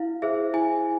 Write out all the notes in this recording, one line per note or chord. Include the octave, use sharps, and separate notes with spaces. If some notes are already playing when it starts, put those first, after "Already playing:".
Already playing: E4 F5
G#4 C5 E5
E4 G#5